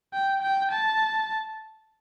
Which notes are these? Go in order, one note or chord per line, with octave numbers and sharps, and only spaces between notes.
G5
G5
A5